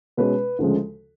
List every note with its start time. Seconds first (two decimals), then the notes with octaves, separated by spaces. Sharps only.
0.17 B2 G#3 C#4 B4
0.59 D2 C#3 F3 G#3